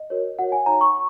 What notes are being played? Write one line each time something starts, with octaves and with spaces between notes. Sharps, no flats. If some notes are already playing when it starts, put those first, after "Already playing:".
Already playing: D#5
F#4 A#4 C#5
F#4 A#4 C#5 F#5
G#5
D#4 F#4 C#5 A#5
C#6